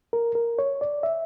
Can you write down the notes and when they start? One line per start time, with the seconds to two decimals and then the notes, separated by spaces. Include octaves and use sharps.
0.13 A#4
0.35 A#4
0.59 C#5
0.81 D5
1.03 E5